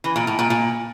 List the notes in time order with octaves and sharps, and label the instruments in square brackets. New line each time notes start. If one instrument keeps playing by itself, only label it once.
[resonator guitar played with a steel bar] E3
A#2
A2
A#2
A#2